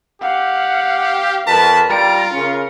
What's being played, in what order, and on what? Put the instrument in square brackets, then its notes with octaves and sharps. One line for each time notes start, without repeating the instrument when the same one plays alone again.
[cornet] G4 [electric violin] F5 [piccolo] F#5
[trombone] F2 [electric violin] A#4 B4 [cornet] A5 [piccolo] B6
[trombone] G3 [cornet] F4 [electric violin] A#5 D7 [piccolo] A6
[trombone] C#3 [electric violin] C#4 A#4 [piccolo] C#7